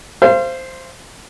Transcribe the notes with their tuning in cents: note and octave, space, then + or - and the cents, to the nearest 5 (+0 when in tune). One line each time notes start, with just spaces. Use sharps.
C5 +0 F5 -35